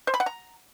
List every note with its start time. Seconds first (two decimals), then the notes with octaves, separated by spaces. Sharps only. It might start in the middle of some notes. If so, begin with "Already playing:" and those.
0.07 C5
0.14 B5
0.20 F#5
0.26 A#5